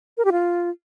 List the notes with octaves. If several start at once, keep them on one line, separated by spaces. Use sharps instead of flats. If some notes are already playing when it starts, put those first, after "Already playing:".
A#4
G4
F4